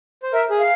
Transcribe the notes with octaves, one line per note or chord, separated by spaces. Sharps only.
C5
A#4 E5
G#4
F5